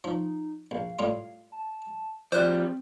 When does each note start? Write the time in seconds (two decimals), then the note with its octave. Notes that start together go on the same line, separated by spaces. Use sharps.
0.04 F3 D#4
0.71 A#1 F5
0.99 A2 G3 F4
1.52 A5
2.32 F3 G3 C4 C5 D5 F#6